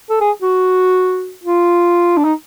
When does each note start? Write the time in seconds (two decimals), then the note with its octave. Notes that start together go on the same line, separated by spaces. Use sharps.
0.10 A4
0.21 G#4
0.42 F#4
1.44 F4
2.17 D4
2.24 D#4